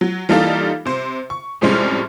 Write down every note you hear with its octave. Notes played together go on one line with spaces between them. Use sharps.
F#3
E3 G3 A#3 D#4 F4 A4
C3 C5
C#6
F2 A2 C3 G3 G#3 C#4